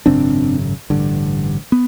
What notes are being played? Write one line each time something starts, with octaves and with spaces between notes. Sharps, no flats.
G#1 F#2 C#3 C4 D4
A1 G2 D3
B3